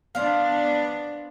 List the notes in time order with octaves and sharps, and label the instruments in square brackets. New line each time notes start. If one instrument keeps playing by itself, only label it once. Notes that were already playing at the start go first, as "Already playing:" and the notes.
[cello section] B3 D4 [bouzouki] C5 D5 F5